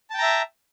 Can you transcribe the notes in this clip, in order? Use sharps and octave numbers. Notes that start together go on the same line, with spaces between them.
E5 G5 A5 A#5